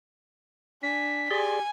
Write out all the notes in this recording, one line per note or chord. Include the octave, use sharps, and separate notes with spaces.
D4 G#5 B6
G4 G#4 D5 G#5 C6